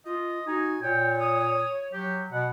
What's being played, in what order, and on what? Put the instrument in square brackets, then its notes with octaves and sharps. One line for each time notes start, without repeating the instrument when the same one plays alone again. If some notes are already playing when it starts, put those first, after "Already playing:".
[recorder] F4 [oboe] D#5
[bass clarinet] D#4 [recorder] F#4 [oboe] G#5
[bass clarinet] A#2 [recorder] C#5 [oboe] G5
[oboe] D#6
[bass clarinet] F#3 [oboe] G4
[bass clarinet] B2 [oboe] F#5